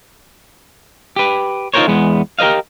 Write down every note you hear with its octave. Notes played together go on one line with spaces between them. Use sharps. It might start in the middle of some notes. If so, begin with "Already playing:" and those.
G4 B4
D#4 F4 A4 A#4 C5 C#5
E2 G#3 B3
G4 A#4 C5 D#5 F5